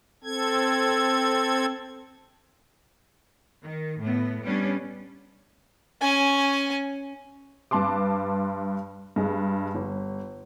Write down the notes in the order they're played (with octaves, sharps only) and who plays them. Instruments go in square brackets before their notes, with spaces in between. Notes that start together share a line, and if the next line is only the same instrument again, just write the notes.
[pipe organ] C4 A4 G#6
[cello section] D#3
A2 B3
G3 B3 C#4 D4
[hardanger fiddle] C#4 G#5
[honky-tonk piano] G2 B4 A5 C6 D6
G2 G#3
G1